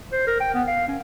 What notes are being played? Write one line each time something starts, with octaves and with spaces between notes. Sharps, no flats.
C5
A#4
G5
B3
F5
C#4